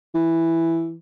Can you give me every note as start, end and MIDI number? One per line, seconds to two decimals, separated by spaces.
0.15 0.95 52